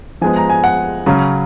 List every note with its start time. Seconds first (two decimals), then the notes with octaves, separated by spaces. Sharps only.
0.21 F3 G#3 B3 G#5
0.36 A#5
0.50 G#5
0.64 F#5
1.06 C#3 F#3 C#4